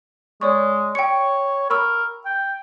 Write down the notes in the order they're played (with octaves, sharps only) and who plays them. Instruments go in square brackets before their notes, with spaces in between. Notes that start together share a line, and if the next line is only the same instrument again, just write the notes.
[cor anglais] G#3 [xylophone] C#5 D5 C#6
[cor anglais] C#5 [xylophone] G5 C#7
[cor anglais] A#4 [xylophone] B5 C#6 E6
[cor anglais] G5